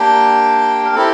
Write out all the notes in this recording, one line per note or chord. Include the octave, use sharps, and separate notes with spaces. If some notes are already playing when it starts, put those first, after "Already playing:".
Already playing: A#3 D4 G4 G5
A#4
C4 E4 G4 A4